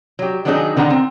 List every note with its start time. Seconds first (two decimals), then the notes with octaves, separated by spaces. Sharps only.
0.19 F#3 G4
0.45 D#3 F#3 B3 D4 D#4 G#4
0.76 D3 D#3 D#4 F#5 A#5
0.90 C4